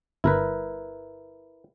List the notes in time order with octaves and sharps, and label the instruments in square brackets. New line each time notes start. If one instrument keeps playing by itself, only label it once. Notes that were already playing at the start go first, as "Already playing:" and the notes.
[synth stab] G1 [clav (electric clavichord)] E4 A#4 B4